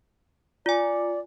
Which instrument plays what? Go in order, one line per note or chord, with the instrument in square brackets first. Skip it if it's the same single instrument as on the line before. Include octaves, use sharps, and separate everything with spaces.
[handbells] F4 G#5 [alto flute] D5